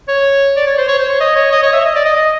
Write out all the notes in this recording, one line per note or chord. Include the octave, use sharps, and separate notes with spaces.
C#5
D5
C#5
C5
C#5
C5
C#5
D#5
C#5
D#5
C#5
E5
D#5
D5
D#5
D#5